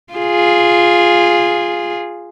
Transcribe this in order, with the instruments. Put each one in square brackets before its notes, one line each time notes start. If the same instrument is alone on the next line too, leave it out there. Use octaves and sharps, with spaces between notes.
[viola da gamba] F4 G#4